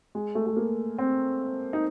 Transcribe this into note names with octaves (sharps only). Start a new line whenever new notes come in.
G#3
A3
A3
A#3
C4
D#4